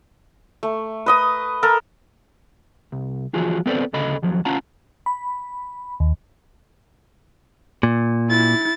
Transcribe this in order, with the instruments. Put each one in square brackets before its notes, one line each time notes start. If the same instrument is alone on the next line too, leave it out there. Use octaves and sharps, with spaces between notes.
[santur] A3
B4 D#5 D#6
A4 A#4
[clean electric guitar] C2
E3 F3 F4 F#4 G#4
B3 C4 A4 B4 C5 D5
D2 C#3 A4 D#5 B5
D#2 F3 F#3
C#4 F4 F5 F#5 A5 A#5
[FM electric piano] B5
D#2
[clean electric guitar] A#2
[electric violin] E4 A6